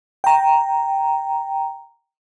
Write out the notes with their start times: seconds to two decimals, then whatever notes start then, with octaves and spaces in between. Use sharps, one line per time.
0.24 G5 A#5